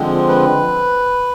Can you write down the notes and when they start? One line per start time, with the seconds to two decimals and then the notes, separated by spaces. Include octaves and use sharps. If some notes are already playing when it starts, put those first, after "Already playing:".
Already playing: D3 F3 G#3 C4
0.28 B4